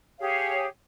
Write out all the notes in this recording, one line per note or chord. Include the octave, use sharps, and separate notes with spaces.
G4 G#4 C#5 F5